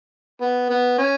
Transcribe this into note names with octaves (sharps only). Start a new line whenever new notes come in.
B3
B3
C#4